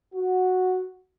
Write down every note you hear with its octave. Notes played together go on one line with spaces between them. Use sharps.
F#4